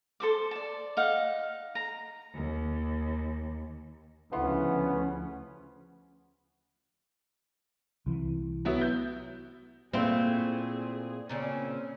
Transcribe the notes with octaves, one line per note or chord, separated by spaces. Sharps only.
A4 C5 D6
D5 A5
D#4 F5 F#5
A#5
D#2
D2 C#3 F3 B3 C#4 E4 F#5 C6
C2 E3
F#3 B3 E4
G6
A#2 A3 C4 E4 F4 G#4 F5
A#2 C#3 C4 C#4